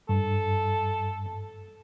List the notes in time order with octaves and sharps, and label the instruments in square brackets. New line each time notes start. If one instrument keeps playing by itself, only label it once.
[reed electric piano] G2 [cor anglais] A4